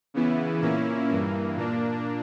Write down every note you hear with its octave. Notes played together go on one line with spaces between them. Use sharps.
C#3 E3 B3 E4
A#2 A#3 C#4 E4
G2 E3 A#3
A#2 A#3 D4